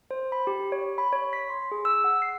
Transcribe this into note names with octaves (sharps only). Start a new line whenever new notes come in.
C5
B5
G4
C#5
B5
C#5
B6
C6
G#4
E6
F#5
C7